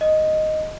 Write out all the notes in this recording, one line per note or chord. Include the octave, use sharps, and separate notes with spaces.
D#5